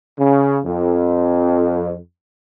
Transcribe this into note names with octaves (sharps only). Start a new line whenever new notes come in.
C#3
F2